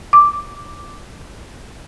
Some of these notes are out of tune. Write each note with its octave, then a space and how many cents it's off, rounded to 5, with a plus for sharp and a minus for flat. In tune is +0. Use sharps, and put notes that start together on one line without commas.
D6 +0